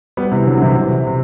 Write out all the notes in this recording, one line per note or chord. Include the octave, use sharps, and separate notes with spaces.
G3 B3
C3 E3
D3 F#3
C3 E3
C3
C3